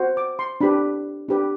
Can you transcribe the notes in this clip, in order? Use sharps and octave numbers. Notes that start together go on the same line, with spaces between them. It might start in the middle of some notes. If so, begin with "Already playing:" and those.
Already playing: F#4 C5
D6
C6
D4 G4 B4 B5
D4 G4 B4